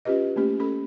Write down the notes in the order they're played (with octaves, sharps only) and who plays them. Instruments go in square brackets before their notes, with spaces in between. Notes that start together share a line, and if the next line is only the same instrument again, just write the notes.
[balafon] C#4 F4 G4 B4 D#5
A3 A#3 C#4 G4
C#4 A4 B5